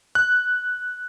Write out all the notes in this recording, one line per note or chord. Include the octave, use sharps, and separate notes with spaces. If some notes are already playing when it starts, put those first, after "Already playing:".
F#6